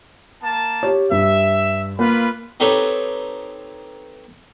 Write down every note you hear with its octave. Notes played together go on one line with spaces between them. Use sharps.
A#3 A5
G4 C#5
G2 E5
A#3 F4 B4 B5
C4 D#4 G4 A4 B4 C#5